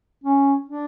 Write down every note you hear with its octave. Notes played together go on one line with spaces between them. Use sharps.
C#4
D4